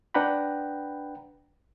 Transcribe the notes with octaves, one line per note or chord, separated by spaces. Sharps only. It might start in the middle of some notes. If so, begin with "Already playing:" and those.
D4 B4 F#5 G5 A#5 B5